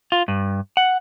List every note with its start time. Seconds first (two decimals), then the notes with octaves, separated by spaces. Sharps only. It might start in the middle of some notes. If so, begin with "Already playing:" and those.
0.12 F4
0.28 G2
0.77 F#5